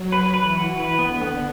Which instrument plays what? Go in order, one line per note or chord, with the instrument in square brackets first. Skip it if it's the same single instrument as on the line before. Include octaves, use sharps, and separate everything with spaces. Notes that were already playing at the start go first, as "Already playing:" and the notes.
Already playing: [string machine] F#3
[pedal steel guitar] B4
[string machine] E3 [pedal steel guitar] B4
[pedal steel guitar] F#4
B4
[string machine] D3 [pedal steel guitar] B3
[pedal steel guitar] B3